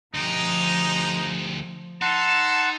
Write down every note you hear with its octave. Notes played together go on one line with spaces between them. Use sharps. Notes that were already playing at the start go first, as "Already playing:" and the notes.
D2 F3 G#3 D#4 G4
D#4 A4 F#5 A5 C6